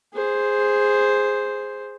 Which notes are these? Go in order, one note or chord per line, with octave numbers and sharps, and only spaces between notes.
G#4 C5